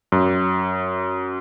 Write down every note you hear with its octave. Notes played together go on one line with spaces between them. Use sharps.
F#2